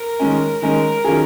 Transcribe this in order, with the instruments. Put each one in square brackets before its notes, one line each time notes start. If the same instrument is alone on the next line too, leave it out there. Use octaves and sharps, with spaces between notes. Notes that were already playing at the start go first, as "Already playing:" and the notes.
Already playing: [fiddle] A#4
[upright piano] D#3 G#3 C#4
[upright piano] D#3 G#3 C#4 [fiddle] A#4
[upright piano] D#3 F#3 C#4 F4 G#4